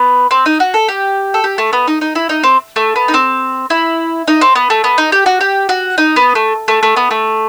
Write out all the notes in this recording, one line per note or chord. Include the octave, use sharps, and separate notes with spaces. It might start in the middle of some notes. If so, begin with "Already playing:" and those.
Already playing: B3
C4
D#4
F#4
A4
G4
A4
G4
A3
B3
D#4
D#4
E4
D#4
C4
A3
B3
D#4
C4
E4
D#4
C4
B3
A3
B3
D#4
G4
F#4
G4
F#4
D#4
B3
A3
A3
A3
B3
A3